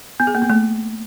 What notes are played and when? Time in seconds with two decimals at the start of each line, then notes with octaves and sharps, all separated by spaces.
0.20 B3
0.27 G#4
0.35 A#3
0.42 B3
0.50 A3